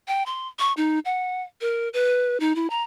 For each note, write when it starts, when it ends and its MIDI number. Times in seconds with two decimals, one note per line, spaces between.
0.08 0.23 79
0.26 0.48 84
0.59 0.73 85
0.77 0.99 63
1.05 1.42 78
1.61 1.89 70
1.93 2.39 71
2.40 2.55 63
2.56 2.69 64
2.70 2.83 82